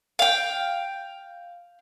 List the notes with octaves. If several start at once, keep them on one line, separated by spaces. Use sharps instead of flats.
F5 G5